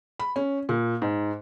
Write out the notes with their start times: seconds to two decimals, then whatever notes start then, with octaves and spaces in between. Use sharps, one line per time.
0.19 B5
0.36 C#4
0.69 A#2
1.02 G#2